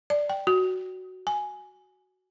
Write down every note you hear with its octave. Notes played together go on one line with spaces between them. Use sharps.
D5
G5
F#4
G#5